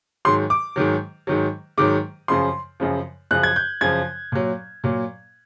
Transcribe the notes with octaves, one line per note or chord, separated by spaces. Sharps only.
G#2 D#3 F#3 C6
D6
G#2 D#3 F#3
G#2 D#3 F#3
G#2 D#3 F#3 D6
F#2 C#3 F3 C6
F#2 C#3 F3
F#2 C#3 F3 F#6
G#6
G6
F#2 C#3 F3 G#6
A#2 F#3
A#2 F#3